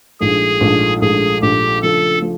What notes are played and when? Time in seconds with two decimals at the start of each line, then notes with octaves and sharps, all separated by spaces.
0.20 A#1 G#2 F3 A3 D4 G#4
0.61 A#1 G#2 F3 A3 D4
1.01 A#1 G#2 F3 A3 D4 G#4
1.42 A#1 G#2 F3 A3 D4 G4
1.82 C#3 F3 A3 D4 A4
2.22 F3